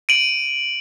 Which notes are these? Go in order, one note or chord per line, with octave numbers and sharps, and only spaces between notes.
D7 D#7 F#7